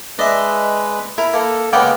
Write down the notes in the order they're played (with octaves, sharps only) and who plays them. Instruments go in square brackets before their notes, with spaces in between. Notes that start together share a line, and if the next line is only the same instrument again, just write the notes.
[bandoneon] G#3 B4 [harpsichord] D4 E5 [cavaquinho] D#5
[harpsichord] E4 [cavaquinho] A#4
[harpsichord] A#3 [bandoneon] A4
[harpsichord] C#3 A#3 B3 [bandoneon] G#3 F6 [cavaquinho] F#5 G5 D6